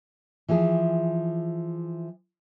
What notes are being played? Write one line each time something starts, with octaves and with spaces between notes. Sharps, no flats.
E3 F3 E4 G#4